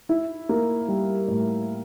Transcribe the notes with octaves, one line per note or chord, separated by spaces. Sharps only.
E4
A#3
G3
A2